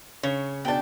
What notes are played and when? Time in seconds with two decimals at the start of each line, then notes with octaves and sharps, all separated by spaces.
0.23 C#3 C#5
0.65 B2 D4 G5 A5